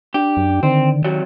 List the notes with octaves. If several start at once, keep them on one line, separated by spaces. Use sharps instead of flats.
D4 G4
F#2
D3 D#3 C4
C2 F#3 G3